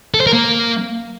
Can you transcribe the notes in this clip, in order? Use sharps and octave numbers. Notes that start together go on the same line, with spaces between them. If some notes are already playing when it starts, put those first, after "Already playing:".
A4
C5
A#4
A#3